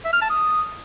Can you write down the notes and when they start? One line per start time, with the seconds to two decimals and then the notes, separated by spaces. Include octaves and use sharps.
0.05 E5
0.13 F6
0.22 A5
0.30 D#6